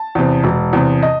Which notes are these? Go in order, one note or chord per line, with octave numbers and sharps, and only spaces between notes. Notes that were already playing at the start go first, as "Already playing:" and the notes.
Already playing: A5
E2 C3
E1
E2 C3
D#5